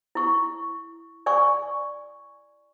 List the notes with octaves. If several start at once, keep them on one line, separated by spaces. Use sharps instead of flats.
E4 C#6
D5 G#5 C#6